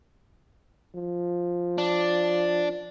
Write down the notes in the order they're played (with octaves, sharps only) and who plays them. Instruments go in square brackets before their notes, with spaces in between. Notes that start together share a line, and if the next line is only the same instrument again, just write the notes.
[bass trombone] F3
[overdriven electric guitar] D4